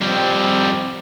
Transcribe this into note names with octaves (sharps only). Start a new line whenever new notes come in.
F2 G3 C4